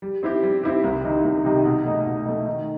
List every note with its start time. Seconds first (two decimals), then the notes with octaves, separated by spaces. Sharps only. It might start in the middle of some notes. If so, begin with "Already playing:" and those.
0.02 G3
0.23 C4 E4 G4
0.43 G3
0.64 C4 E4 G4
0.84 C2
1.04 C3 D#3 G3 D#4
1.24 C2
1.45 C3 D#3 G3 D#4
1.65 B2
1.85 A3 D#4
2.05 B2
2.26 A3 D#4
2.46 D#3